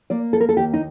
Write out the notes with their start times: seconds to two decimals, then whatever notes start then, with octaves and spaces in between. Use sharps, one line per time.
0.10 A#3 D5
0.33 A4
0.40 A#4
0.49 A4
0.57 D#2 G4
0.73 D#4